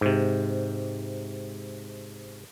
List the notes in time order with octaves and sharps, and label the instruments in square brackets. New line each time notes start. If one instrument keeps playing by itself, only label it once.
[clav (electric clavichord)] G#2 C3